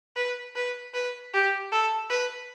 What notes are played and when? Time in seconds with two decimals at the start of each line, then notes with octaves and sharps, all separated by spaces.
0.16 B4
0.55 B4
0.94 B4
1.33 G4
1.72 A4
2.10 B4